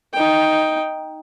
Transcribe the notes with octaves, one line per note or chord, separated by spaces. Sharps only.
D#4 G5